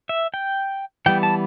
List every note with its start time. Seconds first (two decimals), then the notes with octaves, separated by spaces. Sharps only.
0.09 E5
0.34 G5
1.06 E3 G3 B3 G5
1.23 A5